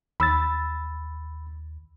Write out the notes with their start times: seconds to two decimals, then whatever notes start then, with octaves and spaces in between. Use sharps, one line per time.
0.20 D#2 B5 E6 A6